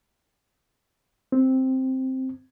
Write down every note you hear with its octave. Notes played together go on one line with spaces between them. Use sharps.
C4